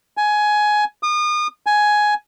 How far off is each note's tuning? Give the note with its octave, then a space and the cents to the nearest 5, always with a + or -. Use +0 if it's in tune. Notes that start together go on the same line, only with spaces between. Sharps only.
G#5 +15
D#6 -35
G#5 +10